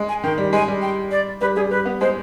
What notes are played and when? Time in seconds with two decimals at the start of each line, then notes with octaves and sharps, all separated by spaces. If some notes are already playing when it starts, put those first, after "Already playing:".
Already playing: G#3
0.09 G#5
0.24 D#3 G5
0.38 G3
0.53 G#3 G#5
0.68 G3
0.82 G5
1.11 D5
1.41 G3 B4
1.56 G3 G#4
1.70 G3 B4
1.85 B3
2.01 G#3 C5